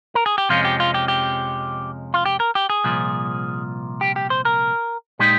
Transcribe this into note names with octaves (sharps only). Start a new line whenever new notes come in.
A#4
G#4
G4
F2 C3 F3 G#3 C#4 F4
G4
F4
G4
G4
F4
G4
A#4
G4
G#4
C2 A#2 F3
G4
G4
C5
A#4
A#2 G#3 D#4 G4